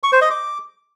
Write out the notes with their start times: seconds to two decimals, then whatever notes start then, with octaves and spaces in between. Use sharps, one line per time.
0.03 C#6
0.12 C5
0.21 D#5
0.31 D6